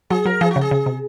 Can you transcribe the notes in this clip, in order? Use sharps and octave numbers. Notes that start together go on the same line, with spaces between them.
F#3 G#4
F#3 A#4
F3 G#4
F#4
C#3
G#4
C#3
C3